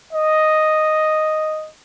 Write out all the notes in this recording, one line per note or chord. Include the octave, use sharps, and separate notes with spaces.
D#5